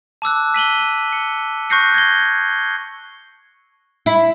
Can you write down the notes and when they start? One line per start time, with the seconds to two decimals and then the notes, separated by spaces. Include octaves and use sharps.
0.22 A5 D6 E6 F#6
0.54 B6 D#7 F#7 G7
1.12 C#7
1.70 C#6 F#6 G6 A#6 C7 C#7
1.94 G#6 A#6 G7
4.06 E4